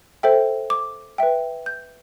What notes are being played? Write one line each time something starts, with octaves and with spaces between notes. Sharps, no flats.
A4 C5 E5 G5
D6
B4 E5 G5
G6